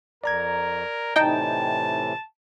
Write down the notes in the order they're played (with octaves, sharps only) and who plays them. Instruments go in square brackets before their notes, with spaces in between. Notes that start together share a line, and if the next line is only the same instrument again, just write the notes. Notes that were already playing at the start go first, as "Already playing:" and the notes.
[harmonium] F2 [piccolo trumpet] A#4 [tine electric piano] D5 A#5 G#6
[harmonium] A2 C3 E3 [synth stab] D#4 G5 [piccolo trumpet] A5